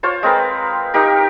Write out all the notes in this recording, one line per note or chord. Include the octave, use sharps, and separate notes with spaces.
F4 C5 C#5
G#3 C4 A#4 B4
D#4 G4 A#4